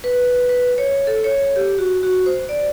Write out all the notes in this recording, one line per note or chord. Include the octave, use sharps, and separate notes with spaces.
B4
B4
C#5
A4
C#5
G4
F#4
F#4
C5
D5